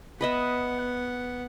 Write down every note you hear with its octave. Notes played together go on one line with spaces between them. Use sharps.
B3 B4 D#5 E5 F#5